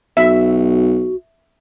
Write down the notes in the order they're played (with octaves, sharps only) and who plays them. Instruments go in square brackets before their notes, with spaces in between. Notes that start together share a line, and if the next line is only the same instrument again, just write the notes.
[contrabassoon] B1 [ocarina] F#4 [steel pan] E5